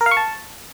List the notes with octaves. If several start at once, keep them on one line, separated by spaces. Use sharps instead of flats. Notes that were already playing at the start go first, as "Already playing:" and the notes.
A#4
F5
C#6
A5